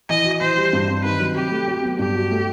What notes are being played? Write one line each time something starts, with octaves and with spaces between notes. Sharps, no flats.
E3 D#5
F#4
E3 C5
G3
G2
C4
D#3 B4
F#3
C3 G4
A3
F#3
B3
G2 G4
F#4
A3